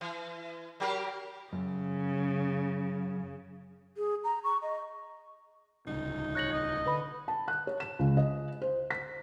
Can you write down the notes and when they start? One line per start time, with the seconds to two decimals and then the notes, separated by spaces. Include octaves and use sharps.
0.01 E3
0.80 F#3 G4 A#4
1.53 F#2 C#3
3.96 G#4
4.24 A#5
4.44 C#6
4.62 D#5
5.87 D1 C2 C#3 D#4
6.35 C#5 F#6 A#6 F#7
6.53 D#5
6.86 D3 B4 B5
7.28 A5
7.48 F#6
7.67 C#5
7.80 E7
7.99 C#2
8.17 D#5
8.62 C5
8.90 B6